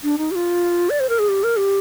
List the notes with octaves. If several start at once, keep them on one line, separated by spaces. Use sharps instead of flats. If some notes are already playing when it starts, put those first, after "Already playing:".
D4
D#4
G4
F4
D5
C5
A#4
G#4
G4
A#4
G4